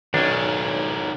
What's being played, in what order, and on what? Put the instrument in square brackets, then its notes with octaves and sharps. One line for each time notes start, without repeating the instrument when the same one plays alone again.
[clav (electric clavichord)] B1 D4 [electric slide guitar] D#3 C#4